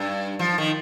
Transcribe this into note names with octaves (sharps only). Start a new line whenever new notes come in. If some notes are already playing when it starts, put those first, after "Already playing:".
Already playing: G2
F3
D#3